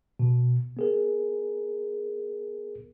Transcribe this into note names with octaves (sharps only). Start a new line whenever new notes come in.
B2
B3 G#4 A#4